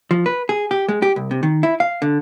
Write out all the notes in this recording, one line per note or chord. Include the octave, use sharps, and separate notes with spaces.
F3
B4
G#4
G4
G#3
G4
C2
C3
D#3
E4
F5
D3